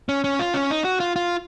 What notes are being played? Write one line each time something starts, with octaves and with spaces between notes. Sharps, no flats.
C#4
C#4
F4
C#4
D#4
F#4
F4
F4